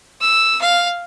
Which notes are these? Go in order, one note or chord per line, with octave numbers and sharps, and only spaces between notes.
E6
F5